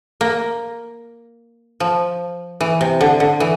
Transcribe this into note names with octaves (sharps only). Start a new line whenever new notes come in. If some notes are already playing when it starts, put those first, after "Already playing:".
A#3
F3
E3
C3
D3
D3
E3